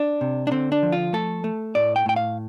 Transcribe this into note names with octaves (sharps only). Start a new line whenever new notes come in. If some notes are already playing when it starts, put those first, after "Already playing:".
Already playing: D4
C3
D4
D3 C4
D4
F3
F4
A3 A4
A3
A2 D5
G5
A2 G5
F5